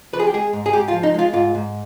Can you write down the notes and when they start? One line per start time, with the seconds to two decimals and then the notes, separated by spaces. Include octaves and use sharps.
0.13 F3 B4
0.19 G#4
0.27 G4
0.33 G#3 G#4
0.53 G#2
0.66 G#4
0.73 G#2 G4
0.88 F4
0.93 F3
1.03 D#4
1.14 G#3 F4
1.33 G#2 F4
1.55 G#2